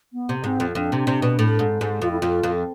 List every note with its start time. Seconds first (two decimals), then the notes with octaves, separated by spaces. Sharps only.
0.13 B3
0.29 C3
0.44 G#2 C4
0.60 F2
0.75 F2 D4
0.92 C3
1.07 C3
1.22 B2
1.39 A2
1.59 G#2
1.81 G#2
2.02 F2 F4
2.11 E4
2.20 F2 F4
2.43 F2